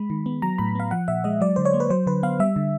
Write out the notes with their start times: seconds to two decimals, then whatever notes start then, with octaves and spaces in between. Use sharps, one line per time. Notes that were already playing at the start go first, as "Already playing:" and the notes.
Already playing: G#3 B5
0.10 D#3
0.26 B3
0.42 F#3 A#5
0.58 A2 B5
0.75 B3 F5
0.91 F3 F#5
1.08 A#2 E5
1.24 G#3 D#5
1.41 F#3 D5
1.56 D3 C5
1.65 C#5
1.74 A#3
1.80 B4
1.90 F#3 C5
2.07 D3 B4
2.23 B3 F5
2.39 G3 E5
2.56 D3